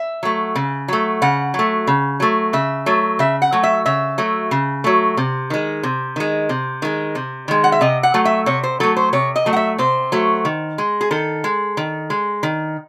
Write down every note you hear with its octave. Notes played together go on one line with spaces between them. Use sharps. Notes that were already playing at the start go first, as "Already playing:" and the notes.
Already playing: E5
F#3 A3
C#3
F#3 A3
C#3 F#5
F#3 A3
C#3
F#3 A3
C#3 E5
F#3 A3
C#3 E5
F#5
F#3 A3
E5
C#3 E5
F#3 A3
C#3
F#3 A3
C3
D#3 G#3
C3
D#3 G#3
C3
D#3 G#3
C3
D#3 G#3
F#5
E5
C3 D#5
F#5
F#3 A3
E5
C3 C#5
C5
F#3 A3 A4
C5
C3 C#5
D#5
F#3 A3
F#5
E5
C3 C5
F#3 A3
D#3
G#3
G#4
D#3 A4
G#3
D#3
G#3
D#3